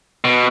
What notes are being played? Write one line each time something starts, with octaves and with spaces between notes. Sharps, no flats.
B2